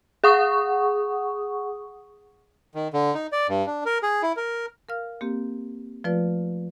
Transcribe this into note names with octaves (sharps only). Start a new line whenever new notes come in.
G#4 F#5 C#6 D#6
D#3
D3
D#4
D5
G2
D4
A#4
G#4
E4
A#4
A#4 F5 F6
A#3 C4 G4
F3 A3 F4 B4 D5